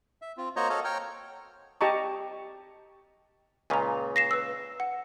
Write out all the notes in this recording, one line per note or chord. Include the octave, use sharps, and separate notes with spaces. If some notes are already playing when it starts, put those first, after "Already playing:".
E5
C4 F4
A#3 F#4 C5 C#5 D#5 A#5
F#4 A4 C#5 D#5 F5
C#5 G5 A#5 F6
G4 D#5 A5 A#5 C#6
C#2 A#2 C#3 G#5 A#5
A#6 C7 E7
B4 E6
F#5